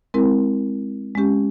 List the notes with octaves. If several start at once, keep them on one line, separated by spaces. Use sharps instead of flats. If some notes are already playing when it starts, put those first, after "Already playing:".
G#3 C4 E4 A#4
G#3 C#4 G4